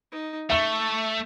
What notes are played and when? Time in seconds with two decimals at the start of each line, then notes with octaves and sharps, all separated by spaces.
0.12 D#4
0.50 A3 E5 C#6 G7